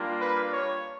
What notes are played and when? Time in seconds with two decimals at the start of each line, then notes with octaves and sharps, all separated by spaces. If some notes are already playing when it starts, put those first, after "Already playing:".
Already playing: G3 A#3 D4 F4
0.22 B4
0.52 C#5